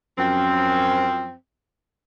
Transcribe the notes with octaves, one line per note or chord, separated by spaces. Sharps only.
F#2 F3 C4